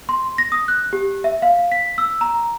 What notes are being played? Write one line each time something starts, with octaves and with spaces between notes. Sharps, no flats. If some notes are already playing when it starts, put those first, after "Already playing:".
C6
A#6
D#6
F#6
G4
E5
F5
B6
E6
A#5